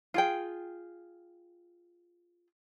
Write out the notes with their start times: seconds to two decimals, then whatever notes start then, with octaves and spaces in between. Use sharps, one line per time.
0.14 F4 G#4 G5